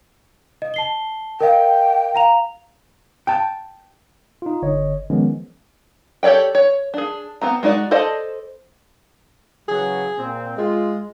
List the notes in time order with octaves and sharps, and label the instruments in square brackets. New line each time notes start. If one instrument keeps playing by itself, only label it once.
[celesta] D#5
A5 C7 G7
[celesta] A#4 D#5 F5 [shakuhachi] G5
[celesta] F5 A#5 F7
[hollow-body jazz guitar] G5 A5
[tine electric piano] D#4 F4
G1 D3 C#5 D#5
D#3 F3 G#3 B3 C#4
[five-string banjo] G4 A4 C#5 D5 G5
C#5
D4 G#4
B3 C4 A#5
G#3 D#4 F#4 D5
A4 C5 D5 D#5 A5
[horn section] C#3 E3 F#3 [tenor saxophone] G#4
[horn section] A#2 C4
[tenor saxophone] G#3 [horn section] F4